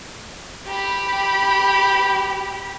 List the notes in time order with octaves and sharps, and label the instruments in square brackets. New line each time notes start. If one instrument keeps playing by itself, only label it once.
[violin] G4 B5